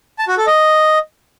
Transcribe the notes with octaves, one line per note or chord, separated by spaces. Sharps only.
A5
F#4
A4
D#5